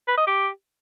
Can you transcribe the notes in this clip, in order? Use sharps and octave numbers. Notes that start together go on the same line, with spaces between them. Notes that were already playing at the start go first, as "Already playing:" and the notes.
B4
D#5
G4